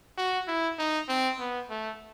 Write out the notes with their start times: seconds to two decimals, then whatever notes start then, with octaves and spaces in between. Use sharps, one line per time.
0.18 F#4
0.48 E4
0.79 D#4
1.09 C4
1.40 B3
1.70 A3